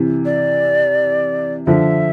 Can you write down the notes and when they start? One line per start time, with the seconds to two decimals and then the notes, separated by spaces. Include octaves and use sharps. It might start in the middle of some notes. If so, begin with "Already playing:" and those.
Already playing: C3 E3
0.25 D5
1.66 D3 F3 E5